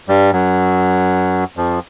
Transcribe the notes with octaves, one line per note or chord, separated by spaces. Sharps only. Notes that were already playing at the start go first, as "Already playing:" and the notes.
G2 G3
F#2 F#3
F2 F3